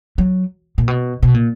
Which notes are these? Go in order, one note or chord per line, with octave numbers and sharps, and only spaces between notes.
F#3
A#2
B2
B2
A#2